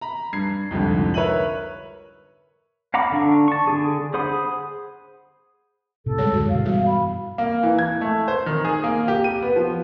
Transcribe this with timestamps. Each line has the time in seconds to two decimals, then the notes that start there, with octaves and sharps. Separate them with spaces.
0.01 A#5 B5
0.33 G2 G#6 C7
0.71 C2 F2 G#2 D3
1.14 A#4 B4 C#5 E5 D#7 F#7
2.94 F5 F#5 A#5 B5 D6
3.12 D3 D4 C#6
3.48 A5 C#6
3.67 D3 D4 G#4
4.14 G#4 C5 F#5 B5 D#6
6.06 A2 C3 A4
6.18 D2 G3 G#3 G#4 C#5
6.33 F#2 D3 F#4
6.49 G2 B2 E3 F5
6.65 G3 F#4
6.86 B5
7.38 A#3
7.63 E3
7.79 G#6
8.01 A3
8.28 C5
8.46 D#3
8.65 G#4
8.84 A#3
9.08 G4
9.24 D#7
9.42 B3
9.56 F3